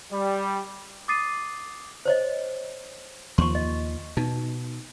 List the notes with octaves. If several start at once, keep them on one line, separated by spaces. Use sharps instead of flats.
G3
D6 D#6 A6 C7 D#7
C5 C#5 D#5
D#2 F3 C6 C#6
D#5
B2 D#4